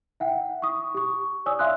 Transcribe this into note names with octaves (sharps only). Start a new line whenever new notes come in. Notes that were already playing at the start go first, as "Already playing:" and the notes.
E5 F#5 G5
C#6 D#6
G4 C#6
C#5 D5 G#5 D#6 E6
E5 F5 G#5 C6 D#6 F#6